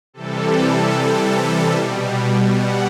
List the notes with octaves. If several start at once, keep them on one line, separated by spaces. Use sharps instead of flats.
C3 E3 G3 A4
B2 G3
F#5